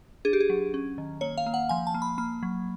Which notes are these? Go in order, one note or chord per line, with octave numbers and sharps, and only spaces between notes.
D4 G#4
G4
G#4
F#3
C#4
D#3
A#3 C#5
F5
A#3
F#5
F3 G#5
A5
A#3
B5
A#3 B5
F#3